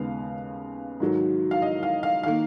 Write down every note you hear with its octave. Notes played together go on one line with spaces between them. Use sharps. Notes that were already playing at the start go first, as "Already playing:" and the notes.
Already playing: D#2 C#3 G#3 B3 F5
G#2 D#3 F#3
F5
D#5
F5
F5
D#3 A#3 F5